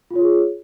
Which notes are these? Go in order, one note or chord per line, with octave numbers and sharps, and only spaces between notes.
F4 G#4 C#5